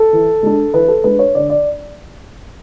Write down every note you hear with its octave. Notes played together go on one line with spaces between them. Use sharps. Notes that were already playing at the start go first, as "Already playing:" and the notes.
Already playing: A4
E3
G#3 D4
E3 B4
A4
G#3 D4 B4
C#5
D3 D5
D5